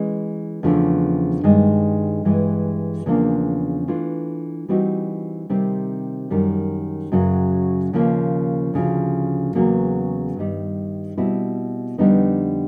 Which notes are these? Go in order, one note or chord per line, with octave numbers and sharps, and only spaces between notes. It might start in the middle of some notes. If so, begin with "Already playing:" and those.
Already playing: E3 G#3 C#4
E2 C#3 F3 A3 D4
G2 D#3 G#3
G2 E3 G#3
E2 C#3 F3 A#3 D4
E3 A3 D4 F4
E3 G3 C4 D#4 F#4
C3 D#3 G3 C4
F#2 D#3 G3
F#2 C#3 F#3
D#2 C#3 F3 A#3
D2 C#3 F3
E2 C#3 F#3 A#3
G2 D#3 G3
B2 G3 C4 E4
F2 D3 G3 B3 D#4